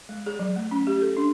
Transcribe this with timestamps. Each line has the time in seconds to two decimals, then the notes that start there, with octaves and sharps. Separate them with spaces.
0.09 G#3
0.26 G#4
0.39 F#3
0.56 A3
0.71 C#4
0.87 G4
1.01 A4
1.17 D4